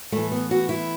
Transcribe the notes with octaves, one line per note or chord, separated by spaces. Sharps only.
A2 E3 A3
B3
F#4
E4